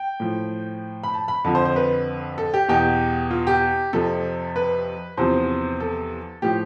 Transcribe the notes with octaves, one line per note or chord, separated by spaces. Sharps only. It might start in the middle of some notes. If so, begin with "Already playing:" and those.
Already playing: G5
A2 F3
B5
A5
B5
F2 D3 F3 A5
C5
C5
B4
A4
G4
E2 B2 G4
F4
G4
F2 C3 F3 A4
B4
E2 C3 F3 C5
A4
A2 F3 G4